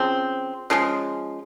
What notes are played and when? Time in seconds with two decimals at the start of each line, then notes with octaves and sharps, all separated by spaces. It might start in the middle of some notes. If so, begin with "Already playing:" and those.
Already playing: C#3 F3 C4
0.70 C#3 F3 G#3